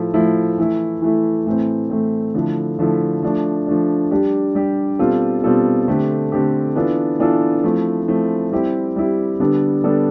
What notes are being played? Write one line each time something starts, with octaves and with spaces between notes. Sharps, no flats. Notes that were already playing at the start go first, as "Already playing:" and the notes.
Already playing: A2 F3 A3 E4
A2 F3 A3 E4
E3 A3 E4
E3 A3 E4
A2 E3 A3 C4
A2 E3 A3 C4
D3 F3 A3 E4
D3 F3 A3 E4
F3 A3 D4
F3 A3 D4
G3 D4 G4
G3 D4 G4
B2 G3 C4 F4 A4
B2 G3 C4 F4 A4
D3 A3 C4 G4
D3 A3 C4 G4
E3 B3 D4 F4 A4
E3 B3 D4 F4 A4
F3 A3 C4 E4
F3 A3 C4 E4
G3 C4 E4 G4
G3 C4 E4 G4
D3 G3 B3 D4 A4
D3 G3 B3 D4 A4